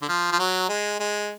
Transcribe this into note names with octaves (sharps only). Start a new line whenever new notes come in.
D3
F3
F3
F#3
G#3
G#3